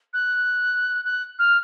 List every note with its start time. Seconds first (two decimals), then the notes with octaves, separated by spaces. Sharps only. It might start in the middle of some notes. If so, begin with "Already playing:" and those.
0.14 F#6
1.05 F#6
1.39 F6